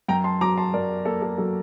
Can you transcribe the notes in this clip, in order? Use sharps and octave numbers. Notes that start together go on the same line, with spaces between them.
F#2 G5 A#5
A5 C6
F#3 A#5 D6
A5 C6
F#2 A#4 D5
A#3 A4
A4
F#3 A4